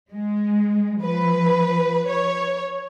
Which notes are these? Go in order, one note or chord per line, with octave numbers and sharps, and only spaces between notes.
G#3
F3 B4
C#5